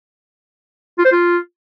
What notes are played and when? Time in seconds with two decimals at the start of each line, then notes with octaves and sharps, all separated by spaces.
0.98 F4
1.05 C5
1.12 F4